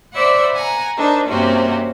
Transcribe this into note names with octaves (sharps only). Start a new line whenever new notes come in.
C5 D5 E5 F#5 B5
F#5 G#5 A#5
D4 D#4 A#4 C5
G2 C3 A#3 C4 C#4 F#4